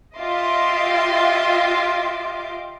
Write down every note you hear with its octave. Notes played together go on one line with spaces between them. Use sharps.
F4 G4 D#5 E5 C6 D6